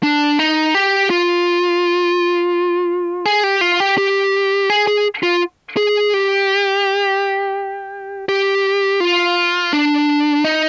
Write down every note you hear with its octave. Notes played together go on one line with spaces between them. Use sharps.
D4
D#4
G4
F4
G#4
G4
F4
G4
G4
G#4
G#4
F4
G#4
G4
G4
F4
D4
D#4